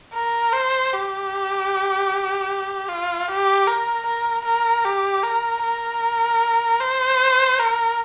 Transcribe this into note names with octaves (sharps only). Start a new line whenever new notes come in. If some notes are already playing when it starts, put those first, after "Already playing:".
A#4
C5
G4
F4
G4
A#4
A#4
A#4
G4
A#4
A#4
C5
A#4